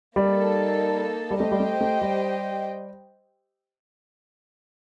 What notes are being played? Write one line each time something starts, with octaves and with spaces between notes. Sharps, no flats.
G3 A#3 D#4 A4
G3
A3 G4 C5 D#5 G5
G3
A3
A3
G3